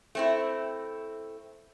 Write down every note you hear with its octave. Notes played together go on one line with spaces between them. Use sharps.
A3 C4 E4